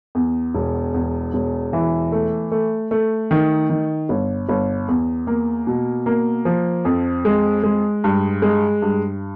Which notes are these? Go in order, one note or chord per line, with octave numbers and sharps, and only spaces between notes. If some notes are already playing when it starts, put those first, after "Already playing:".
E2
E1
E2
E1
E3
A3
A3
A3
D#3
D#3
G1
G1
E2
A#3
B2
A#3
F3
F2
G#3
G#3
G2
G#3
G2